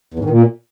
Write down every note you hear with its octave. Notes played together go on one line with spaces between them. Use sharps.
E2
G#2
D#3
A#2